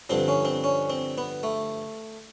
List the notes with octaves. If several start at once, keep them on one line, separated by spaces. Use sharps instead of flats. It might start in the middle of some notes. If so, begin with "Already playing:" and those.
G2 D3 F3 C4
C#4
C4
C#4
C4
B3
A3